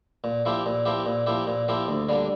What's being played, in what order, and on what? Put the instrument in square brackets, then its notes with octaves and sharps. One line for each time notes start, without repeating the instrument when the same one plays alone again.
[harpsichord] A#2
F3 A#3 E4 G4
A#2
F3 A#3 E4 G4
A#2
F3 A#3 E4 G4
A#2
F3 A#3 E4 G4
D2
D3 G3 A#3